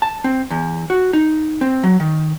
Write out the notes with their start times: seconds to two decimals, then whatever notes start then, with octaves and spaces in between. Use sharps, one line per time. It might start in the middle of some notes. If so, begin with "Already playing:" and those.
0.02 A5
0.24 C4
0.50 E2
0.90 F#4
1.13 D#4
1.61 C4
1.83 F#3
2.00 D#3